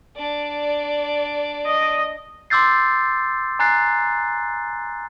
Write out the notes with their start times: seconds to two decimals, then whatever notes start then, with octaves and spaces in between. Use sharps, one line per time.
0.16 D4 D5
1.66 D#5
2.50 C6 D6 E6 G6 A6 C7
3.59 G#5 A#5 F#6 A6 C7